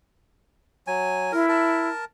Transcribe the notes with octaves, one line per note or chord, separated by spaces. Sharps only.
F#3 G#5
E4 A#4
A#4 A5